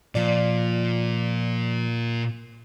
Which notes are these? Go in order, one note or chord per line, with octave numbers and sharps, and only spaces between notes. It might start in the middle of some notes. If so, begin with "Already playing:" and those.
A#2 F3 D5